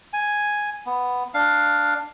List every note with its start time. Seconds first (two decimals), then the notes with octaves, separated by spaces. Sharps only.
0.13 G#5
0.86 B3
1.34 D4 F5